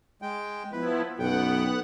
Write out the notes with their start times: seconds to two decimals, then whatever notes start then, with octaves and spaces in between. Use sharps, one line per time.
0.22 G#3 G5
0.72 F3 B3 E4 B4
1.19 B1 F#2 B3 F#5 G5